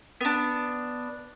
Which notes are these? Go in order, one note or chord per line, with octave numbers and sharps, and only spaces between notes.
B3 D4